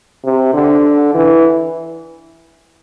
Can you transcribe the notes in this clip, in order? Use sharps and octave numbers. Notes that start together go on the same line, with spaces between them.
C3
D3
E3